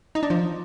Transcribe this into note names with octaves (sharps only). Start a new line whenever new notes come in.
D#4
D4
F3